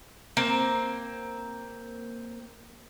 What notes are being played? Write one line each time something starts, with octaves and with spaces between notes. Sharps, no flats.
A#3 C4